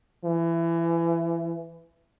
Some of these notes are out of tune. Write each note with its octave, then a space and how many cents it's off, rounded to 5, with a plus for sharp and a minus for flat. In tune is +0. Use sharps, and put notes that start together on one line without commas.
E3 +25